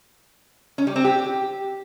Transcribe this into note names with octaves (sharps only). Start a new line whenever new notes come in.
C#4
G3
C4
G4